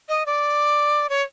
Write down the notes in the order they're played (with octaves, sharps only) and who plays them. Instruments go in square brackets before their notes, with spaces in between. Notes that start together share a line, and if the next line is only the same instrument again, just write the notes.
[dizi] D#5
D5
C#5